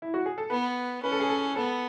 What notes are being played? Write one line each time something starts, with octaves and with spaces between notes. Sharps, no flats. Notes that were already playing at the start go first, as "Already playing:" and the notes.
E4
F#4
G#4
A4
B3 B4
C#4 B4
A4
G#4
A4
B3 A4